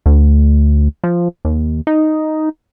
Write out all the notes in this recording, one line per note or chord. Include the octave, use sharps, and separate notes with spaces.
D2
F3
D#2
D#4